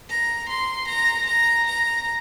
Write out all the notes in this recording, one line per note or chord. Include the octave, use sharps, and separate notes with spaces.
A#5
C6
A#5
A#5
A#5